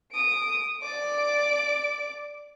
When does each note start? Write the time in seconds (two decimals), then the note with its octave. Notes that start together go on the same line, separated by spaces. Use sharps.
0.12 D#6 D7
0.82 D5 D6